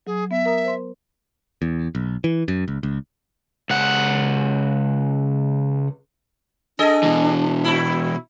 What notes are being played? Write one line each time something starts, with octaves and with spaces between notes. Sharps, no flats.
F#3 G#4
B3 E5
A#4 A#5 D#6
C5 C6
E2
B1
E3
F#2
C#2
C#2
C#2 F#5
D4 G#4 A4 D#5
B2 E3
A#2 E4